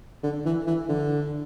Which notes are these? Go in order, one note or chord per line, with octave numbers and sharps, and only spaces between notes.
D3
E3
E3
D3